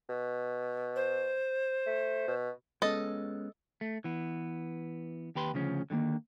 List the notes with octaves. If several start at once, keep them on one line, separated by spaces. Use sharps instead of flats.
B2
C5
A3
B2
G#3 B3 C#4 A4 D#5
A3
E3 B3
D#2 G4 B4 C6
D2 C#3 F3 C#4
D3 D#3 F3 A#3